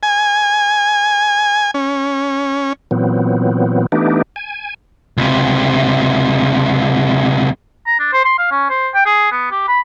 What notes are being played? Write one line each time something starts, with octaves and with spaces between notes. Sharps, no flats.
G#5
C#4
A#2 E3 F#3 B3 C4
E3 A3 B3 D4 D#4 G4
G#5
C#2 C3
A#5
D4
C5
C6
F5
C#4
C5
G5
G#4
B3
G4
B5